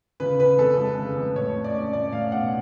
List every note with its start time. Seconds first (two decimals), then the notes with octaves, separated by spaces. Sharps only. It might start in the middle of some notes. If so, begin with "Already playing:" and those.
0.20 C#3 B4
0.39 C#3 B4
0.58 F2 A4
0.78 G#3
0.97 C#3
1.16 F2
1.35 A2 C#5
1.55 A2
1.64 D5
1.74 C#4
1.93 A2 D5
2.12 A2 F5
2.32 B1 F#5